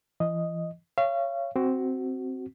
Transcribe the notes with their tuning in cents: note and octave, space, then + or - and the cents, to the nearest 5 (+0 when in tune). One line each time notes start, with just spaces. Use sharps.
E3 +35 D#5 +0
C#5 +0 F5 -35
C4 +0 F#4 +15